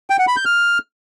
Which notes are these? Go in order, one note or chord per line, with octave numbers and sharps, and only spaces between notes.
G5
F#5
B5
G6
F6